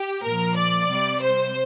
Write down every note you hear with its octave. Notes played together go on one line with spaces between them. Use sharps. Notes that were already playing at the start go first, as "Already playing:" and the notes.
Already playing: G4
A#2 F3 A#4
D5
C3 G3
C5